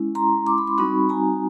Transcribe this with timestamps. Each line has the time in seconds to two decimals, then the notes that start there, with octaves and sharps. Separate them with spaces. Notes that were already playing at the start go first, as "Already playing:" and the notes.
Already playing: G#3 C#4 E4
0.15 A#5 C6
0.46 C6 D6
0.58 B5
0.67 C6
0.78 G3 C4 D#4 F#4 B5 C#6
1.09 G#5 A#5